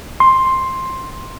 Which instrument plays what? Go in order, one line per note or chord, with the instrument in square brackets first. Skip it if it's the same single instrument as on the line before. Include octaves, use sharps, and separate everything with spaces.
[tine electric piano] C6